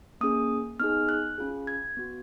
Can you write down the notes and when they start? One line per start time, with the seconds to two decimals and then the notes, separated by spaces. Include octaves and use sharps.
0.21 A#3 C#4 G#4 D#6
0.79 B3 D#4 G#4 F6
1.09 F#6
1.38 C#4 F4 G#4
1.67 G#6
1.97 B3 F#4